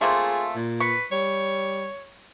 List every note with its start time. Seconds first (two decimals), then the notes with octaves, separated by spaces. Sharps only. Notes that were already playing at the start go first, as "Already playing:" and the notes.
0.01 A3 A#3 C4 F4 G#4
0.56 A#2
0.80 B4 C#6
1.12 G3 C#5